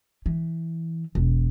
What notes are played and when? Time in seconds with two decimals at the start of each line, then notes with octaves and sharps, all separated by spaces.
0.26 E3
1.15 E1